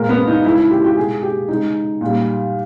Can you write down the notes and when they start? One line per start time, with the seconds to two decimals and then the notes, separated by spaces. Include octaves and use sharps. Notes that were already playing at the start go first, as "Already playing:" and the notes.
Already playing: A#2 G#3 A#4
0.09 B3
0.27 D#4
0.44 C#3 G#3 E4
0.57 E4
0.71 G4
0.84 G4
0.96 B2 G#3 G#4
1.23 G4
1.49 C#3 G#3 D#4
2.01 A#2 G3